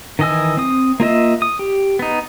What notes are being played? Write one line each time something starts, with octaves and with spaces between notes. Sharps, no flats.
D#3 E3 D#5 G#5 E6
C4 D#6
A#3 F4 D#5 E5
D#6
G4
B3 D#4